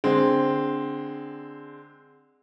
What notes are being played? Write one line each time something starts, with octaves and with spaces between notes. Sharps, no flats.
D3 G#3 C4